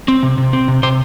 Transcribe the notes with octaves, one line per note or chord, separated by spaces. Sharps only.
C4
C3
C3
C4
C3
C3 C5